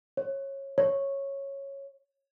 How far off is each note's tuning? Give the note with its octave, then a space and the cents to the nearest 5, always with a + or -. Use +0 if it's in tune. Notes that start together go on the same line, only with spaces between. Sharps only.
C#5 -20
C#5 -10